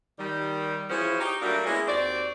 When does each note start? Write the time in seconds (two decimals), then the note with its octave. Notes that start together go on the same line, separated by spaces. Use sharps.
0.19 D#3 G3
0.90 E3 F3 C#4 F#4 G#4 C5
1.20 D#4 G4
1.41 F#3 G3 A3 A#3 D4 F#4
1.65 G#3 A#3 B3 C#4 E4 G#4
1.87 D#2 C4 F#4 D5